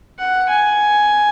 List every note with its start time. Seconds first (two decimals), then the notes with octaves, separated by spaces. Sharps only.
0.18 F#5
0.48 G#5